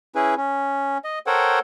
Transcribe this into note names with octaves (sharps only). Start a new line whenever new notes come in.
C#4 E4 G#4 B4
C#4
D#5
A4 A#4 C5 C#5 F#5 G5